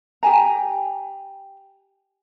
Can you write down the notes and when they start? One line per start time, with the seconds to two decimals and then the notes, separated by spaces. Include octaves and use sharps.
0.23 G4 G5 G#5 A#5